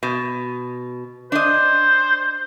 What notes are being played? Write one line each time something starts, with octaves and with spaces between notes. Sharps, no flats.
B2
D4 C5 D#5